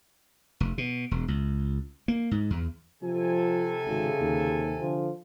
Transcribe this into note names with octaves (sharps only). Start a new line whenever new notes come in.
F1
B2
E1
C#2
A#3
G#2
E2
C3 F3 A4 G#5
G#1 C#3
D#2
D3 F3